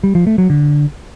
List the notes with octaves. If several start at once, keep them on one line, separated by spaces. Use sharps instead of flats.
G3
F3
A3
F#3
D3